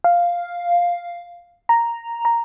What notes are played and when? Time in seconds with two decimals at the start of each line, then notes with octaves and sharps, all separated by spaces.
0.04 F5
1.69 A#5
2.25 A#5